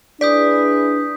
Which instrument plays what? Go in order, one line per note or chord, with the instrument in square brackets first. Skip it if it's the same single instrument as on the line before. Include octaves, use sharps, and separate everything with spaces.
[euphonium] D4 [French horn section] E4 G#4 B4 [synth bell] D5 [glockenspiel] D#6 G6 B6